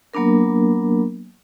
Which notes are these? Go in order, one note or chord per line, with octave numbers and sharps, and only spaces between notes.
F#3 A#3 B3 D4 A#4